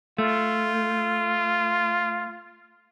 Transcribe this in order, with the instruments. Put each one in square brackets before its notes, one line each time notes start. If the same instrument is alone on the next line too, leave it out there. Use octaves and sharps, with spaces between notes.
[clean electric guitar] A3 [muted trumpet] F4